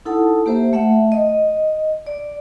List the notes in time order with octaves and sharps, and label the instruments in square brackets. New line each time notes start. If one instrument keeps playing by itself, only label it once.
[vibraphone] D#4 E4 A4 F#5 A5
A#3 G4 C5 E5
A3 E5 F#5
D#5
D5